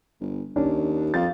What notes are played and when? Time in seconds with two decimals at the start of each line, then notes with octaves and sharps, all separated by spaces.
0.21 G1
0.56 D#2 C#4 D4
1.14 F2 F5 A6